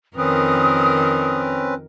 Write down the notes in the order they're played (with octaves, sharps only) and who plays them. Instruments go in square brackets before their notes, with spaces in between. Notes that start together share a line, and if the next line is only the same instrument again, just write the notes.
[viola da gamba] F2 D#3 A#4 [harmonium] C4 C#4 B4 [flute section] D#6